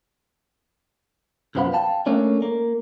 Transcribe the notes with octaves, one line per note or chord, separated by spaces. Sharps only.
C2 F#2 F3 B3 F5 B5
F5 G5 A5
A3 A#3 C#4 D4
A#3